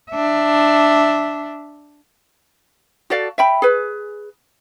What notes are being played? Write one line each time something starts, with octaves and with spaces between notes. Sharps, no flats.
D4 E5
F#4 A4 D5 F5
E5 G5 B5
G#4 B4